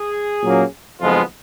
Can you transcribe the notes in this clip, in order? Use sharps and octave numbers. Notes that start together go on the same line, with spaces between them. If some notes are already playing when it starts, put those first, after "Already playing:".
Already playing: G#4
A#2 F#3 A#3 C#4
F#1 F2 F3 G#3 B3 F4